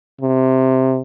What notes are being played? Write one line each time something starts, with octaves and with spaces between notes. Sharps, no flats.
C3